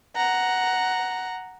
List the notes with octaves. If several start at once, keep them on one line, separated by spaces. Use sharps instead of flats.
F#5 A#5